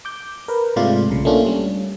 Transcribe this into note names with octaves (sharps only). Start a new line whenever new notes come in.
D6 G6
A#4 B4
G#2 C3 G#3 A3 F4 D5
B1 C#3
A3 A#3 C#4 D4 F4
G3 C#4